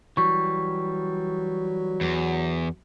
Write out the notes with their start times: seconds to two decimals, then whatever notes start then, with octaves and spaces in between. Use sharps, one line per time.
0.17 E3 F#3 G3 C#6
2.01 E2